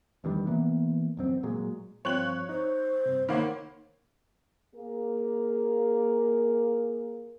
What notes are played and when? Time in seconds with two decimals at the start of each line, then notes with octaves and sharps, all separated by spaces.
0.24 E2 G2 D#3 G3
0.47 B2 E3 A#3 B3
1.17 E1 F#2 C4
1.43 A#2 F#3 G#3
2.05 G2 F3 C4 C#5 F5 F#6 F#7
2.49 D#4 C5
3.06 G2 C3
3.29 D#3 A#3 C5 C#5 F#5 B5
4.75 A#3 G#4 A#4